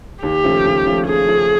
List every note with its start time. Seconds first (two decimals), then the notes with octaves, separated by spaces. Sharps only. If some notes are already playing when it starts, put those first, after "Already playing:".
0.23 D#2 G4
0.44 C#3 F3 A3
0.65 D#2
0.85 C#3 F3 A3
1.06 D#2 G#4
1.27 C#3 F3 A3